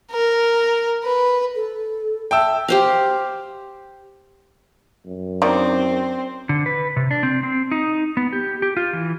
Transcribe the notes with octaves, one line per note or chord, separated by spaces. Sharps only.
A#4
B4
A4
E5 G5 A5 E6
G4 C5 F5
F#2
D#3 C4 D4 D5
D3
B4
C3
D4
C4
C4
D#4
B3
G4
G4
F4
E3